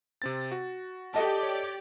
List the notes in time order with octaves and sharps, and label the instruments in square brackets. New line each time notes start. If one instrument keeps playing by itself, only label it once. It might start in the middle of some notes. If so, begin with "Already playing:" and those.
[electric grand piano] C3 C4 A6
F#4
[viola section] G4 D5 [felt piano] A4 D#5 A5
[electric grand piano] C#5